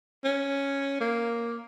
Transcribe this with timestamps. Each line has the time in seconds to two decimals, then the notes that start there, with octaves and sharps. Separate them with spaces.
0.25 C#4
1.00 A#3